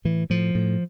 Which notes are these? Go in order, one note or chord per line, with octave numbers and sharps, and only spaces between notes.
A2 E3
A2 F3
A2